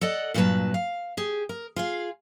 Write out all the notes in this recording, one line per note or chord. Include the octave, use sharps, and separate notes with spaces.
A4 D5 D#5 F#5
G2 A#2 F#3 A4 B4 A5
F5
G4 G#4
A#4
F4 G#4 F5